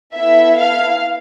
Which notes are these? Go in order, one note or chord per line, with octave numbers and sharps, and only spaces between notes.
B3 E4 A4 E5
F5